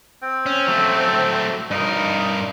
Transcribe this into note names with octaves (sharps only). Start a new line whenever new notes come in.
C4
C#4
F#3 A3
G2 D#4 A#4